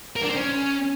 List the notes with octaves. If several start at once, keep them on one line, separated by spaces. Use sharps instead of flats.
A#4
D4
C5
C#4